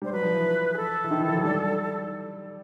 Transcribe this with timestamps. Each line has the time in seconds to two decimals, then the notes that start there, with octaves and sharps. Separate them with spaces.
0.02 G3 C5
0.12 F#3 B4
0.23 F3
0.34 E3
0.74 G#4
0.77 A4
1.04 E3
1.11 D#3
1.19 E3
1.28 F3
1.36 F#3
1.43 G3